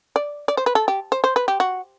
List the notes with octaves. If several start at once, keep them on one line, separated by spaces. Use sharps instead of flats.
D5
D5
C5
B4
A4
G4
C5
C5
B4
G4
F#4